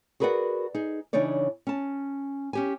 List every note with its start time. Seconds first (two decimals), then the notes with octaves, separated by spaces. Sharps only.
0.20 F#4 G#4 A#4 B4 D5 F#5
0.75 D#4 G#4
1.13 C#3 E3 D4 D#4 C#5 D5
1.67 C#4 A5
2.53 C#4 G4 G#5